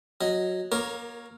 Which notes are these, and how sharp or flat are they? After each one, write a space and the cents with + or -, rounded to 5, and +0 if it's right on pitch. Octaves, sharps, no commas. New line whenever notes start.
F#3 -10 D#5 +0
A#3 +30 A#4 +0 C#5 +0